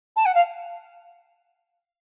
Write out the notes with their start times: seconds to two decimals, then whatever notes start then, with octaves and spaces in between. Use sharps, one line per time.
0.16 A5
0.25 F#5
0.34 F5